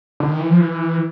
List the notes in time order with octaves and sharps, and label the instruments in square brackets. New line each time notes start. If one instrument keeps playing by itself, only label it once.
[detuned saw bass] D3
D#3
E3
F3
E3